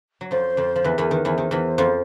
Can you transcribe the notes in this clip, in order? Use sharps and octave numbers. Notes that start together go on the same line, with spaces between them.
F#3
F2 F3 C5
F2 F3
F3
E2 E3 B4
E2 E3 A#4
D#3 B4
E2 E3 C5
D#3
E2 E3
F2 F3